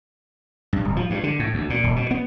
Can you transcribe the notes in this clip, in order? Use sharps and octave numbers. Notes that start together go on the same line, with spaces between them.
G2
D1
F3
G2
D3
A2
D2
A#2
D#1
B2
B3